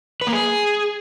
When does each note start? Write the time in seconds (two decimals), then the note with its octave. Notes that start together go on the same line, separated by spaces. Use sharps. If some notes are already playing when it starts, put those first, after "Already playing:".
0.21 B4
0.27 A#3
0.33 G#4